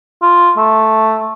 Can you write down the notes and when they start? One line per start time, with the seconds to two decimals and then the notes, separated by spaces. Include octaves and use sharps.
0.22 F4
0.57 A3